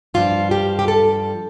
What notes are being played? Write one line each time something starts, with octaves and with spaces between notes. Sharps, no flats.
G2 F3 D4 F4
G4
G4
A4